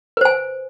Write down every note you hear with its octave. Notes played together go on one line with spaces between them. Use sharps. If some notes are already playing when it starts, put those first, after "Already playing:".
B4 C5 G#5